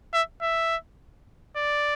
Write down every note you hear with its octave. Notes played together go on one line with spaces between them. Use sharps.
E5
E5
D5